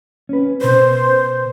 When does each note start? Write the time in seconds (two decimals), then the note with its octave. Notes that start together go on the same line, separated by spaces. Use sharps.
0.29 C#4 B4
0.61 B2 B4 C5